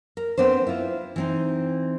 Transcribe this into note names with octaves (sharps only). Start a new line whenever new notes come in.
A#4
B3 C4 D4 C5
E4 F4
E3 C4 D#4